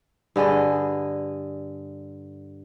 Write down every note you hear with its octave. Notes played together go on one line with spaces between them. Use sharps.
G2 D3 G#4 D#5